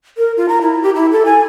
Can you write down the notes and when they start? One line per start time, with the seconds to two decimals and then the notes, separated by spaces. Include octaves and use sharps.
0.18 A#4
0.37 F4
0.49 A#5
0.62 E4
0.83 G4
0.95 E4
1.12 A4
1.25 G#5